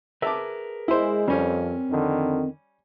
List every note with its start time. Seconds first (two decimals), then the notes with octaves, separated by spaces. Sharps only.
0.22 G#4 A#4 B4 E5 A5 D6
0.88 G#3 E4 C5
1.28 F2 G3 C4 C#4 A#4
1.89 F2 D3 D#3